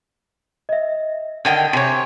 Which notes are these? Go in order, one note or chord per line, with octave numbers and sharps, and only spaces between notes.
D#5 E5
D3 D#3 F#5 G5 G#6
C3 C#5 G#5